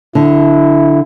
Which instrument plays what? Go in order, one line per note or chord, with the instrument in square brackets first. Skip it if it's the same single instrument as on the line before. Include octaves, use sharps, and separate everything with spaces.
[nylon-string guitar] D3 [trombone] E4